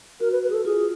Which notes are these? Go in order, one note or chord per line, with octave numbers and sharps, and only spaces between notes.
F#4 A#4
B4
B4
G#4
A4
F4 G#4